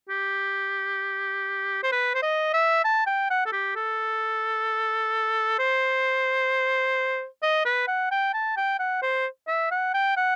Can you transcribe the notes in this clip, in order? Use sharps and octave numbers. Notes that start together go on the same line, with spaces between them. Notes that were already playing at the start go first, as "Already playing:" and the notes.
G4
C5
B4
C5
D#5
E5
A5
G5
F#5
A4
G4
A4
C5
D#5
B4
F#5
G5
A5
G5
F#5
C5
E5
F#5
G5
F#5